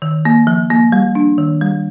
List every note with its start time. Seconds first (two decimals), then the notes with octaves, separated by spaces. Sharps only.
0.02 D#3
0.25 A#3
0.47 F3
0.71 A#3
0.92 G3
1.15 D4
1.38 D#3
1.61 G3